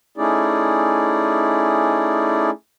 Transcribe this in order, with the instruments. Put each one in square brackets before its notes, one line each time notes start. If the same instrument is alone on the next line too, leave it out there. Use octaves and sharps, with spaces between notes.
[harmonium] A3 C#4 D#4 E4 G#4 D5